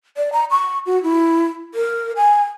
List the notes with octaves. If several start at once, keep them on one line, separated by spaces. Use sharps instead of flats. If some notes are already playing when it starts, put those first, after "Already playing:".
D5
A#5
C#6
F#4
E4
A#4
G#5